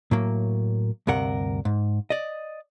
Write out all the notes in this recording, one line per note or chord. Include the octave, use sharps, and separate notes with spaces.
A2 F#3 A#3
D2 G2 C3 A#4 F#5
G#2
D5 D#5